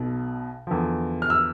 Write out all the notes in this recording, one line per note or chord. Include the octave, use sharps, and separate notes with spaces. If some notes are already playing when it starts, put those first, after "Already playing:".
Already playing: B1 B2
E2 D3 F3
F6
E6